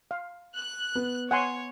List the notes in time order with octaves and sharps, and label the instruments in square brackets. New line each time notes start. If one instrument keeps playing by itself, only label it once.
[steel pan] F5
[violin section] F#6
[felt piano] B3
[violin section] C#5 [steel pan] F#5 G#5 C6